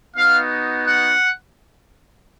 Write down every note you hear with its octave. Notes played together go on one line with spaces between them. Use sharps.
B3 D#4 F#4 F5
F#5